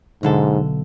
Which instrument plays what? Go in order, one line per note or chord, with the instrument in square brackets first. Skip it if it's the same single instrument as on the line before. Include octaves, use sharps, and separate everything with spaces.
[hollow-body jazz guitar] B1 D3 A4 [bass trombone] G#2